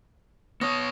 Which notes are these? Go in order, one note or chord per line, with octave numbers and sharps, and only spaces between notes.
B3 C#5 C#6 D#6 A#6